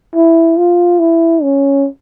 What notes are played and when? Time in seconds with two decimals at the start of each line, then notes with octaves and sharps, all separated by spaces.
0.15 E4
0.58 F4
0.99 E4
1.42 C#4